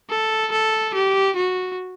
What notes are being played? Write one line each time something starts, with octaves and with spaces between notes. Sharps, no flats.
A4
A4
G4
F#4